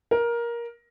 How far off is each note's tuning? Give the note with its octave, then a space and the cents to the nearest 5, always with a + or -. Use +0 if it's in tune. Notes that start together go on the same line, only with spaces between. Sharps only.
A#4 +15